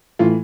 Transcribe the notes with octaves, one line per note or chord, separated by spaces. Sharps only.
A2 E3 F4